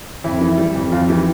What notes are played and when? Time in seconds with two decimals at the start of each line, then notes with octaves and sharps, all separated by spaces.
0.24 F2 E4
0.41 E3
0.58 G3
0.75 F2
0.92 F2 F4
1.09 E3 G4